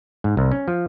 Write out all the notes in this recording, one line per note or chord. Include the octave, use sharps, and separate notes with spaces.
G#2
C2
C#4
F3